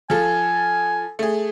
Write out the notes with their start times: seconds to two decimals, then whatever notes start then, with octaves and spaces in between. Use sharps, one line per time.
0.10 F3 A4 G#5
1.19 A3 G#4